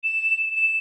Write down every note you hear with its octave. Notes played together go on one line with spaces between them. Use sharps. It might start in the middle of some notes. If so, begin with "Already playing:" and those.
E7
E7